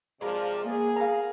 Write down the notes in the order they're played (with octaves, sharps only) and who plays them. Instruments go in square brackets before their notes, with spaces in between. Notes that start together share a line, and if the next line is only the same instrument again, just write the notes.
[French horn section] C3 F3 D5 [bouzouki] G#3 A#4 F5
[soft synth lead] A#3 [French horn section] B3 G#4
[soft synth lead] A#4 [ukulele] F5 A#5